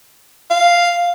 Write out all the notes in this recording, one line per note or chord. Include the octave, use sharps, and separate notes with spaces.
F5